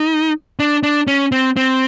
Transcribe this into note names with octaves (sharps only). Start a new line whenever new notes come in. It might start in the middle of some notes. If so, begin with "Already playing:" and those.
Already playing: D#4
D4
D4
C#4
C4
C4